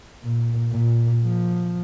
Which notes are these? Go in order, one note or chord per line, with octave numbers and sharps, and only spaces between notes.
A#2
A#2
F3